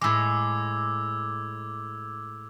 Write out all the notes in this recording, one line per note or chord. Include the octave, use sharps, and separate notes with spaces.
A2 G#3 D6 E6 G#6